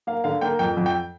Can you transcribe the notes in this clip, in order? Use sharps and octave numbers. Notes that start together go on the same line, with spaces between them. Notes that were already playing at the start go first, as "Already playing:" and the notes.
A#3 F5
D3 F5
A#3 G5
F2 G5
F2
G5